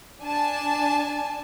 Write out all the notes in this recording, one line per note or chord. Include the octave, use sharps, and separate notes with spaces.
D4 G#5 A5